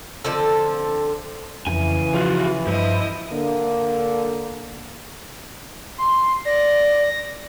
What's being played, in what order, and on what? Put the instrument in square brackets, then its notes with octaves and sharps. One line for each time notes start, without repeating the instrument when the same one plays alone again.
[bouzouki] D3 F3 C4 A4
[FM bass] F2 [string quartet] C#3 [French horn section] E3 [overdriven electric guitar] G#5
[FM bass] F3 [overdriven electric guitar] F4 F#4
[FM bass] G2 [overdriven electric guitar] F3 [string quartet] E4 D#5
[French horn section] D3 A#3
[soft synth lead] C6
[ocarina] D5 [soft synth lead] A#6